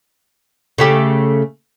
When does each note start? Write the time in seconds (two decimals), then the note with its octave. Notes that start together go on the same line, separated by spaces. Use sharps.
0.78 C#3 A3 G4